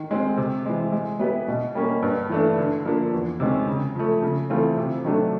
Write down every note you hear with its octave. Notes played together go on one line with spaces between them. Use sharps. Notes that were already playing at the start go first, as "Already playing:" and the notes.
Already playing: D#3
G#3 C4
C3
E3 G#3
G#3
B3 E4 G4 B4
B2
G3 A#3 C#4
G2
E3 A3 D4
D3
F3 A#3 D4
E2
C3 D#3 G#3 C#4
C#3
F3 A3
C#3
E3 A3 C4 F4
C3
D#3 F#3 A3 D4